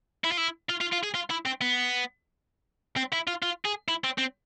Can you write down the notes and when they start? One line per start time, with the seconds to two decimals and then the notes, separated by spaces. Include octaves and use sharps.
0.24 E4
0.32 F4
0.38 E4
0.70 F4
0.81 F4
0.93 F4
1.04 G#4
1.15 F4
1.30 E4
1.46 C4
1.61 B3
2.97 C4
3.13 E4
3.28 F4
3.43 F4
3.65 G#4
3.88 E4
4.04 C4
4.18 C4